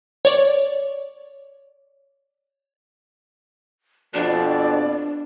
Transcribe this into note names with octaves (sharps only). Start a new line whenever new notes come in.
C#5 D5
F2 B2 D4 D5